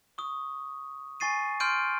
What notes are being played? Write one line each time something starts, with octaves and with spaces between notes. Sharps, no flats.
C#6 D#6
G#5 C#6 A6 C7 D#7
C6 F6 G6 D7 D#7